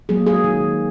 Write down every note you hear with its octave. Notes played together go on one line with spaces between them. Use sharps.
F#3 A#3 G#4
G#4
D#3